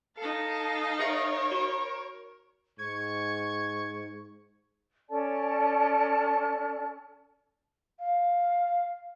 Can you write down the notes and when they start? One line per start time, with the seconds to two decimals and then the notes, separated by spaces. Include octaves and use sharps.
0.18 D#4 A4 F5 A5
1.00 G#4 A#4 C#5 E5 D#6
1.51 F#4
2.79 G#2 C#6 G#6
5.09 C#4 A4 D5 A5
7.99 F5